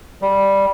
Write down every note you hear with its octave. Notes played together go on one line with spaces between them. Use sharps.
G3